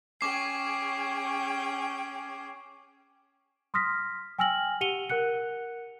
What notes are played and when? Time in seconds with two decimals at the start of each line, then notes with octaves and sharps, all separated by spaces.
0.21 C#4 G#4 G5 C#6 D6 C7
3.74 C6 D#6 F6 A#6 B6
4.39 G5 G#5 E6 F6 A#6 F#7
4.81 G4 F#5 C#7 D#7 F7 G7
5.09 A#4 F#5 F#6 C#7